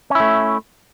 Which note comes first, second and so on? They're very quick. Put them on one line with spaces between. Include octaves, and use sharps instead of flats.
C#4 E4 A3